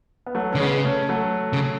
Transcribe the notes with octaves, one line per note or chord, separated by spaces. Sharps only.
B3
F#3 A3
C#4
D3
C#3 G#3 B3
A3 C#4
F#3 A3
C#3